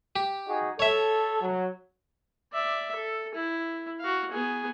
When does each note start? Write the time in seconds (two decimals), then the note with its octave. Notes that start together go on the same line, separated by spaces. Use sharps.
0.16 G4
0.48 D#4 F#4 G#4
0.79 A4 C#5 E5
1.42 F#3
2.53 D5 E5
2.95 A4
3.34 E4
4.00 F#4 F5
4.31 B3 G#4